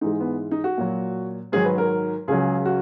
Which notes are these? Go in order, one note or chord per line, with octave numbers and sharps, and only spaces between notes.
G#2 E3 G#3 D#4
B3
D#4
F#4
A#2 F#3
G#2 D#3 F#3 G#4
B4
A#4
C#2 C#3 F#3 G#4
F#4